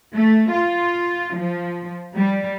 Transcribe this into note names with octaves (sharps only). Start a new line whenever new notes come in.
A3
F4
F3
G3